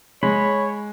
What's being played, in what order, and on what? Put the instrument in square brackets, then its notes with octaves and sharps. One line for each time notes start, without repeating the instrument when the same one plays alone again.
[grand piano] G#3 [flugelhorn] C#5 [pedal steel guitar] B5